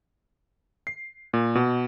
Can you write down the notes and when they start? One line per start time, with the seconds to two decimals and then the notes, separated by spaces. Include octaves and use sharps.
0.87 C7
1.34 A#2
1.55 B2